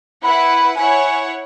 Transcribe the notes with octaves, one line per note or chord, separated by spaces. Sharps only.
E4 B4 F#5 B5
E4 C#5 F#5 G#5